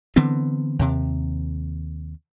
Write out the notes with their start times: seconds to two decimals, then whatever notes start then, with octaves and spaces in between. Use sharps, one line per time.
0.16 D3 E3 B3 C4
0.79 D#2 C3